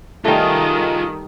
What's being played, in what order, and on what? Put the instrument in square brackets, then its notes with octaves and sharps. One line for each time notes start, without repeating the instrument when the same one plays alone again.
[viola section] D#3 [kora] G3 A3 [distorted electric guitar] F4 G#4